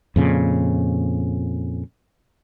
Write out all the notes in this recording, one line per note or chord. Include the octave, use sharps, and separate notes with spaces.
F2 A#2 C#3